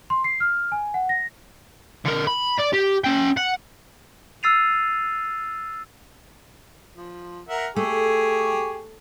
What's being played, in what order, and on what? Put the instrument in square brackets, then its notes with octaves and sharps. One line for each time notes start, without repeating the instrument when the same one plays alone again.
[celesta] C6
C7
F6
G#5
F#5
A#6
[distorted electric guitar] D3 A#4
B5
D5
G4
C#4 G5
F#5
[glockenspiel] E6 F6 A6 C7 D#7 F7
[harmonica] F3
A#4 E5 F#5
[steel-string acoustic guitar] A3 [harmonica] G4 G#4 C#6